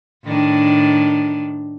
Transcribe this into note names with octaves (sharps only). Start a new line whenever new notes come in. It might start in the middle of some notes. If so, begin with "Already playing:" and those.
A2 D#3 D4